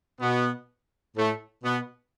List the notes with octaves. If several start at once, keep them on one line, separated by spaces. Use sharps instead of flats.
B2 B3
A2 A3
B2 B3